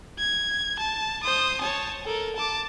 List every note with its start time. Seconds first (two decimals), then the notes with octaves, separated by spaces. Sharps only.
0.19 G#6
0.79 A5
1.23 C5 D#6
1.61 C#5 A5
2.05 A4 A#4
2.36 A5 D6